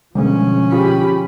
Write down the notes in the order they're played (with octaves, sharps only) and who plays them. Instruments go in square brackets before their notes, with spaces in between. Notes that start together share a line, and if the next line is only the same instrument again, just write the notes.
[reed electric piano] B2 D3 [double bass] F3 C#4 [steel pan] G3 G#3
[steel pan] F4 G#4 [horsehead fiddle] G4 B5